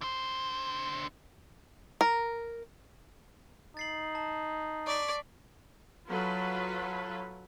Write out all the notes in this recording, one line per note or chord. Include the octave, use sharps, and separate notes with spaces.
D3 C5
A#4
D#4 A6 C7 F#7
A5
D5 C#6 D6 B6
F#3 F4 A4 B4 B5